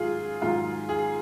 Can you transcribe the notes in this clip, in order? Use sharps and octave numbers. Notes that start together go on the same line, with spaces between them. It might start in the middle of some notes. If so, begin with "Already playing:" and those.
Already playing: G#2 D#3 F#3 F4 G#4
G#2 D#3 F#3 F4
G#4